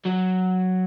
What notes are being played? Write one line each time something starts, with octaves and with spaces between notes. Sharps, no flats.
F#3